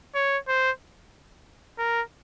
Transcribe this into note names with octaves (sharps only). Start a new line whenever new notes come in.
C#5
C5
A#4